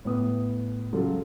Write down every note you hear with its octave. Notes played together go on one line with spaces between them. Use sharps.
A2 B3 D#6
C#3 F#3 F4 A4